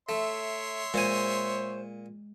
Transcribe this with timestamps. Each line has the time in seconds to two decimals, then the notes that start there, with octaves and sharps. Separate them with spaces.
0.09 A3 C#5 E5 C6
0.94 A#2 G#3 C5 G#5